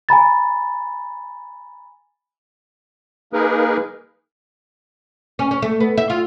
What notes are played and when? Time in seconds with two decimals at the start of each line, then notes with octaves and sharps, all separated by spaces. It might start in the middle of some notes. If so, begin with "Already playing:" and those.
0.09 G#5 A#5 B5 A6
3.33 A#3 D#4 G#4 A#4 B4
5.39 C#4
5.51 C#4
5.62 A3
5.80 B3
5.98 E5
6.10 F4